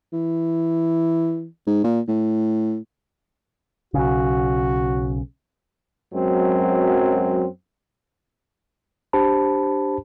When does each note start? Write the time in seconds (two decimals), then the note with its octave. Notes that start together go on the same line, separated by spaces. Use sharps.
0.13 E3
1.67 G#2
1.84 A#2
2.08 A2
3.94 B1 C#3 F#4
6.14 F#2 F#3 G#3 C4
9.13 D4 G4 C5 A5 B5